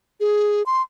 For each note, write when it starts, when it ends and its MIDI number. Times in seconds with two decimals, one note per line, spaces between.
0.20 0.63 68
0.66 0.82 84